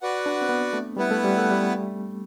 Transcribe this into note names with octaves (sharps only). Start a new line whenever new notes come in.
F#4 B4 D5 F#5
D4
C4
B3
A3
G3 B3 E4 B4 F#5
A3
G3
A3
G3